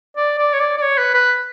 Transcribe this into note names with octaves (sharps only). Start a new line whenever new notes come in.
D5
D5
C#5
D5
D5
C#5
B4
B4